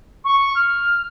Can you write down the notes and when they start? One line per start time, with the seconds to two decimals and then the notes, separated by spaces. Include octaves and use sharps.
0.25 C#6
0.55 F6